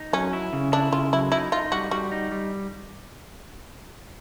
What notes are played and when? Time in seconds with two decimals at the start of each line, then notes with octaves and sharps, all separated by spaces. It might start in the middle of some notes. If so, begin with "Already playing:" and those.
Already playing: D#4
0.13 F#3 C#4
0.33 E4
0.53 C#3
0.72 D4 E4
0.93 C#3 F4
1.13 F#3 E4
1.32 D#4 E4
1.52 D#4 F4
1.72 G3 F#4
1.91 G3 F#4
2.12 D#4
2.32 G3